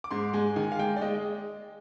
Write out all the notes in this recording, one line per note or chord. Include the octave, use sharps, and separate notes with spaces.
D6
G#2 C6
G#3 G#5
D#3 G#5
F5
G#3 G5
D5
G#3 D#5